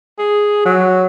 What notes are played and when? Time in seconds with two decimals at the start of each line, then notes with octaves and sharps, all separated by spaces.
0.18 G#4
0.65 F#3